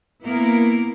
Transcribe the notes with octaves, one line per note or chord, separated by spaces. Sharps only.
A#3 B3 E4 A#4